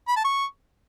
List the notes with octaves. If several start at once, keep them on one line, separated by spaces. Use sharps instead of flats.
B5
A5
C#6